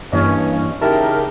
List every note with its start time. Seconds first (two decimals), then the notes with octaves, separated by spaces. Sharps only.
0.13 G2 E3 A#3 C#4 D#5
0.82 C#3 D#4 E4 G4 A#4 E5 A5